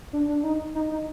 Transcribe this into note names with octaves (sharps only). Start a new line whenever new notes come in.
D4
D4
D#4
D#4
D#4